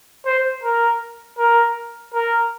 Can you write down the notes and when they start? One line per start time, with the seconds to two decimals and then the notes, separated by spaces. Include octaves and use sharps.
0.25 C5
0.63 A#4
1.38 A#4
2.13 A#4